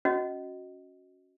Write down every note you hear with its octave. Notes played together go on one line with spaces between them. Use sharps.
C#4 F#4 D#5